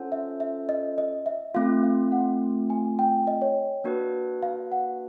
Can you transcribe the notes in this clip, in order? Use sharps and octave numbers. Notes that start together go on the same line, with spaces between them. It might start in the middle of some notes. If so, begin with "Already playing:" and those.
Already playing: C#4 F4 A4 C5 F#5
E5
E5
D#5
D#5
E5
A3 C4 F4 F5
F5
F#5
G#5
G5
D#5
C#5
A#3 D4 F#4 B4
F5
F#5